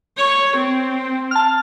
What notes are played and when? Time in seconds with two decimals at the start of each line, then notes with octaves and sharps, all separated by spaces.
0.18 C#5
0.57 C4
1.31 A5 F6